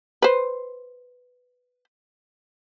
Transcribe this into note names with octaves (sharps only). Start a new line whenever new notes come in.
B4 C5